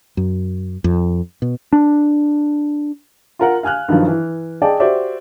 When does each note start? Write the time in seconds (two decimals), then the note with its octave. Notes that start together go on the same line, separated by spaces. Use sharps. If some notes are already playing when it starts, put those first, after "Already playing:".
0.17 F#2
0.84 F2
1.42 B2
1.73 D4
3.39 F4 A#4 F#5
3.63 F5 G#5 F6 F#6
3.88 G2 D#3 F3 F#3
4.08 E3
4.62 G#4 D5 D#5 G5 A5
4.80 F#4 G4 C5 D5 E5